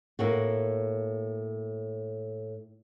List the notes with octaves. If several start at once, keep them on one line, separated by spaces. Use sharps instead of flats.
A2 A#3 F#4